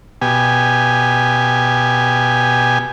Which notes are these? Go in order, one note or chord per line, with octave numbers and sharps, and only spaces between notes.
B2 G4 G#5